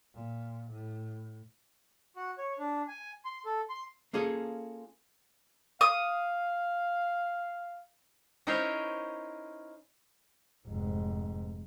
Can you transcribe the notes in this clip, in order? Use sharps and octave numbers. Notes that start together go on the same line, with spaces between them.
A#2
A2
F#4
C#5
D4
G#5
C6
A4
C6
A#3 C#4 F4 G#4 A4
F5 D#6
C#4 D#4 E4 A#4 C5 C#5
F1 G#2